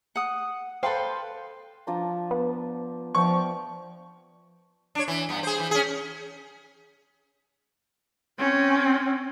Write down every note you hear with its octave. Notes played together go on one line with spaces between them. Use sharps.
F#5 D#6
A4 B4 C5 F5 G5 C6
F3 D4 A#5
B3
F3 D5 E5 G5 C#6
D4 C#5
E3
G2 B3
G#4 C5
E3
C#4 G#4
C4 C#4